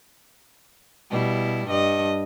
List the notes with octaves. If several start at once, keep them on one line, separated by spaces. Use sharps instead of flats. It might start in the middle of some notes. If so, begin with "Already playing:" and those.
B2 G3 E4
G2 D#5